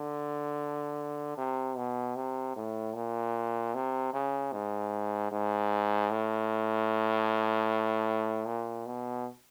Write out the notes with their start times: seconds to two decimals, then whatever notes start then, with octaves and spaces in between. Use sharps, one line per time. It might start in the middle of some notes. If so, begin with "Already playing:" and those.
Already playing: D3
1.37 C3
1.77 B2
2.16 C3
2.56 A2
2.95 A#2
3.75 C3
4.13 C#3
4.52 G#2
5.32 G#2
6.11 A2
8.46 A#2
8.86 B2